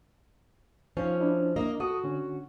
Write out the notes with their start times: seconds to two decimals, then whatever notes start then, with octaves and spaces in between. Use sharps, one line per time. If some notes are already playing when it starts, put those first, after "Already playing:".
0.97 F3 C#4 D#4 F5
1.21 D4 E4
1.56 A#3 A#4 D#5
1.80 F#4 A4 D#6
2.04 D3 C#4